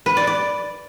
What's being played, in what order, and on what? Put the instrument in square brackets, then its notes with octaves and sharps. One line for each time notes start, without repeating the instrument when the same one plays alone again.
[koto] B4
D5
D5